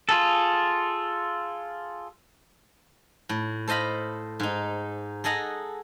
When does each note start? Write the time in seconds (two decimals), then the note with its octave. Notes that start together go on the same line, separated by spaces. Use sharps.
0.09 F4 G#4 A4
3.29 A2
3.68 A4 C5 D#5 F5 B5
4.40 G#2 D#4
5.24 G#4 A4 D#5 F#5 A#5